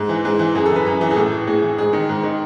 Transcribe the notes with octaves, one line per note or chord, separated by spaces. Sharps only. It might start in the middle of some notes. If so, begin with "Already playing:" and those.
Already playing: G#2
E3
G#2
E3
F#2 G#4
A4
E3
B4
F#2
E3
G#4
A2 A4
E3
A2 G#4
E3
G#2 G#4
D#3
G#2
D#3